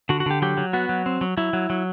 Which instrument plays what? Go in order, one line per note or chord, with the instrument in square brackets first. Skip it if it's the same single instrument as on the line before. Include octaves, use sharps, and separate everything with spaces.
[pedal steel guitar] D3 F#4
F#4
D3 G4
F#3 G4
F#3
B3 F#4
F#3
C4
F#3
F#3 E4
F#3
F#3